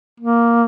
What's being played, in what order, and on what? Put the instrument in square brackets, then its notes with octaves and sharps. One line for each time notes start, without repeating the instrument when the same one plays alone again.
[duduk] A#3